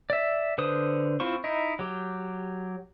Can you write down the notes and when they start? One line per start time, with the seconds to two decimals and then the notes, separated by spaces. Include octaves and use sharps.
0.10 D5 E5
0.58 D3 B4 C5 D#6
1.20 C4 E4 F4 C5 C#6
1.44 D#4 E4 D#5
1.79 F#3 G4